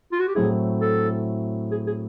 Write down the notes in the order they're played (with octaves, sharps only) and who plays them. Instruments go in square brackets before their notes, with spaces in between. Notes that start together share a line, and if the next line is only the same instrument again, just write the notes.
[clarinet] F4
F#4
G4
[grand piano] A2 F#3 A3 C4 E4 [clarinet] G#4
[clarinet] A4
G#4
G#4